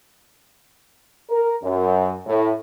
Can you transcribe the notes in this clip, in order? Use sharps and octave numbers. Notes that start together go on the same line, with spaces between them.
A#4
F#2
A2